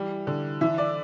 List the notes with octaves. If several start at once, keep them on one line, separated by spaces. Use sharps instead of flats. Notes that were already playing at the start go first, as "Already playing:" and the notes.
Already playing: E3 G3
D3
E3 E5
D5